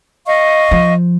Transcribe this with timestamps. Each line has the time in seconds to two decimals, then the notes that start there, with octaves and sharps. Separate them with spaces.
0.26 D#5 F5 C#6
0.71 F3